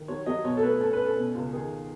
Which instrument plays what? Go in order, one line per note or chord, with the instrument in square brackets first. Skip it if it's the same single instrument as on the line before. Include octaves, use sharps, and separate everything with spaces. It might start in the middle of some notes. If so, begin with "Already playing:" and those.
Already playing: [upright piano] D#3
F#3 C#5
F#3 D#5
B2 C#5
A4
A3 B4
C#4 A4
B4
C#4
A4
B2
C#2
D#3 G#4